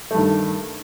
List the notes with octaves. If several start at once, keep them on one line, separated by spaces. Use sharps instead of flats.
G2 D#3 A3